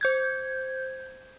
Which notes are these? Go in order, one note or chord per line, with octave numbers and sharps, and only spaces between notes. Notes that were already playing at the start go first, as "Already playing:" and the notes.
C5 G6 G#6